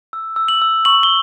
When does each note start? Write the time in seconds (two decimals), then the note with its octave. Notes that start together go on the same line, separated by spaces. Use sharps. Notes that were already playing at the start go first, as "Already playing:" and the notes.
0.13 E6
0.36 E6
0.48 F#7
0.62 E6
0.85 C#6 F#7
1.03 G7